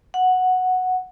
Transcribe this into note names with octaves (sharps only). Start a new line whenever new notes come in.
F#5